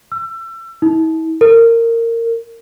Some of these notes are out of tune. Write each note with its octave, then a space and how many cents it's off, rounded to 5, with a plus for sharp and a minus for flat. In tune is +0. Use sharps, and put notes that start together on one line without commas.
E6 +30
E4 -45
A#4 -20